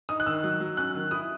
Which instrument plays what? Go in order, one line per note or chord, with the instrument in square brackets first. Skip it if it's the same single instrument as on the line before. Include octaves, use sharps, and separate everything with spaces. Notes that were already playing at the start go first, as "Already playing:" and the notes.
[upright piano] D#4 D#6
F#6
D#3 E6
F#3
F#3
C#4 F#6
D#3
E4 D#6